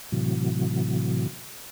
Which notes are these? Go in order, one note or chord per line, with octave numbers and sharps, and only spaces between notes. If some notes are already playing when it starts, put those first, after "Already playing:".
A2 C3 E3 F#3